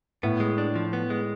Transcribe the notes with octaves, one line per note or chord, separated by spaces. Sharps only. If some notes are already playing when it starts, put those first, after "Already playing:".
A2 B3
G#3
D4
F3
B3
G#3